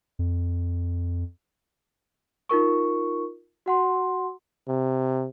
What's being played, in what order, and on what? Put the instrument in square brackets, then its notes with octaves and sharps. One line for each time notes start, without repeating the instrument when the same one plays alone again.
[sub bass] F2
[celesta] D#4 F4 A#4 C#6
F#4 F#5 C6
[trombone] C3